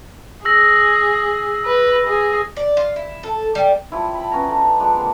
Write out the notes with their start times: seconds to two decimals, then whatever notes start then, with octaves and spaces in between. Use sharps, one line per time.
0.45 G#4 E6 A#6
1.65 B4
2.07 G#4
2.57 D5
2.77 F4
2.96 E4
3.23 A4
3.55 G3
3.92 F3 G3 E4
4.15 A5 B5
4.32 B3 C#4 A#5
4.49 D3 D4
4.80 F3 G#3 D4
4.97 C3 A#3